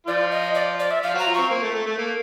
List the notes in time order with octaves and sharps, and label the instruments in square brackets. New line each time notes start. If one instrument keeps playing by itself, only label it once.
[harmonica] F3 F4 [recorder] D5
[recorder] D#5
D5
D5
E5
[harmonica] F3 F4 [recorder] F5
[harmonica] F#3 F#4 [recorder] A#5
[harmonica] F3 F4
[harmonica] C4 [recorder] C#6
[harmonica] A#3
A3
A3
A3
A#3